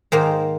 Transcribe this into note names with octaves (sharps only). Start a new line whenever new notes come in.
G#2 D#3 A#3 C5